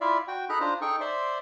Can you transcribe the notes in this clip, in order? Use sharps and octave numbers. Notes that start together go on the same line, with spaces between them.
E4 F4 D5 E5 F5
F#4 G5
D#4 G#4 A4 A#5 B5 F#6
D4 F4 C5 A#5
D#4 G#4 A4 G5 C#6
C5 D5 E5 C6